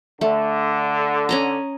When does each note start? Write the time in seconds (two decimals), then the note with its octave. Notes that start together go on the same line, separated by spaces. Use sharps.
0.21 D3 A3
1.29 C#4 D#5 A#5